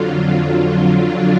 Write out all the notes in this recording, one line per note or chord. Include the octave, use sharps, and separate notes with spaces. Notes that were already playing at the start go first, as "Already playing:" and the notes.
Already playing: F2 D3 F#3 F4
D4